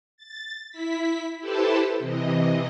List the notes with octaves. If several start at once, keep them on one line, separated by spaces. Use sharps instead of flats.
A6
E4 B6
E4 G4 A4 B4 C5 A5
C3 E3 D#5